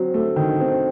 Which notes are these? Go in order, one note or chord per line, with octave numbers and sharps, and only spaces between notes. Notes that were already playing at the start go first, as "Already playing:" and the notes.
Already playing: F#3 C4
A3
D#3
C4